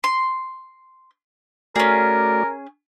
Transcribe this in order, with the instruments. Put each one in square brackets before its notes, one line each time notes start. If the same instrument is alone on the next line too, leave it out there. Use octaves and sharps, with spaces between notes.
[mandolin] C6
[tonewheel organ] A3 F#4 D5 [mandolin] C#4 G#4 [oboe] A#4